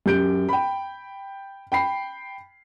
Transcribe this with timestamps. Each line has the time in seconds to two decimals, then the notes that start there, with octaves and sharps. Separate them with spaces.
0.06 F#2 G4 G6 D7
0.49 G5 B5
1.72 G5 B5 C7